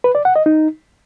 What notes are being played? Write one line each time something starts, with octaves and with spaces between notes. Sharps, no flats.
B4
D5
F#5
D#5
D#4